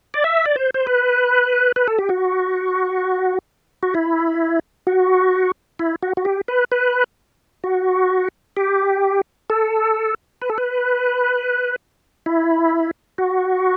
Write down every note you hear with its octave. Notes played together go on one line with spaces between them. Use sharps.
D5
E5
D5
C5
C5
B4
B4
A4
G4
F#4
F#4
E4
F#4
E4
F#4
F#4
G4
B4
B4
F#4
G4
A4
B4
A4
B4
E4
F#4